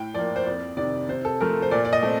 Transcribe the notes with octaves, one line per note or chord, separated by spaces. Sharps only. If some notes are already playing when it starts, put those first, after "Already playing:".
Already playing: A2 G5
F3 A#3 D5
C5
F2 D5
C3 D#3 D5
C3 C5
A4
F3 A3 A#4
C5
A#2 D5
D5
D#5
A3 C4